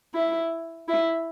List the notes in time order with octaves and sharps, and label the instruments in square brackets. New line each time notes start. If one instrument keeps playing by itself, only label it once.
[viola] E4
E4